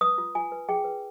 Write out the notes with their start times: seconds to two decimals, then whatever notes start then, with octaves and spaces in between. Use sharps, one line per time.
0.01 B4 D#6
0.18 F4
0.35 F4 G#5
0.52 B4
0.69 G#4 G5
0.85 B4